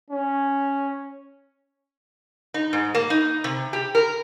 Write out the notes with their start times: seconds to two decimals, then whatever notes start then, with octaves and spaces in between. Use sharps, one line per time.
0.10 C#4
2.54 D#4
2.73 G#2
2.95 A#3
3.10 D#4
3.44 C3
3.73 G4
3.95 A#4